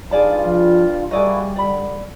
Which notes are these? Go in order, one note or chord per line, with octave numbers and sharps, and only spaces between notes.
G2 G3 D#4 F4 G#4 D5 A5
F3
G3 A#3 E4 F#4 G#4 D5 D#5
D3 D5 B5